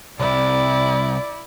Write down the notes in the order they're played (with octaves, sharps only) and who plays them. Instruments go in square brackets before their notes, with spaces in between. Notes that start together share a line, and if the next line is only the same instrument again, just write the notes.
[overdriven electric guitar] C2 C3 [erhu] E4 [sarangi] D5